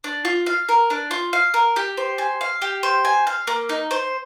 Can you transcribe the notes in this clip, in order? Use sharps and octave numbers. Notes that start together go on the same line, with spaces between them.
D4
F4
F5
A#4
D4
F4
F5
A#4
G4
C5
G#5
F5
G4
C5
G#5
F5
A#3
D#4
C5